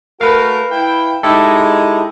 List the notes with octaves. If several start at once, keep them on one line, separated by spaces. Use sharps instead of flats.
A3 F#4 A#4 B4 F5
E4 G5
G#3 D#4 E4 G4 A4